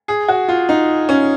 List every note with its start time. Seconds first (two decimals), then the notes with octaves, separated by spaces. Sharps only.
0.08 G#4
0.28 F#4
0.48 F4
0.69 D#4
1.09 C#4